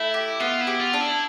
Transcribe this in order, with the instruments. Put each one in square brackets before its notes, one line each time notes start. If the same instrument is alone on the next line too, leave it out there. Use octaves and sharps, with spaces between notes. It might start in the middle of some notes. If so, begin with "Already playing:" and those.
Already playing: [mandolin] A3 [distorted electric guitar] E4
[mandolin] G4
[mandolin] B3 [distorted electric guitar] F4
[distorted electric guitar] E4
[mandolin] G4
[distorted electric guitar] F4
[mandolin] D4
[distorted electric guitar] E4